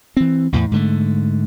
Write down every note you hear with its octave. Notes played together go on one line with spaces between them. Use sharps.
E3 C4
A1 E2 A2
G#2 D3 A3